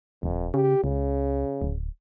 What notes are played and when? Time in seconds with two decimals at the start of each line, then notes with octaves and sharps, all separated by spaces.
0.23 D#1 F2
0.54 C#3 G4
0.84 C#2 C#3
1.62 D1